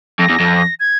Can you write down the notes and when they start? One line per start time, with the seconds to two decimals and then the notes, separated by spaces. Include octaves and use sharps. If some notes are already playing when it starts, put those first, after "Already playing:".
0.19 F2 A#6
0.29 E2
0.40 F2
0.80 G#6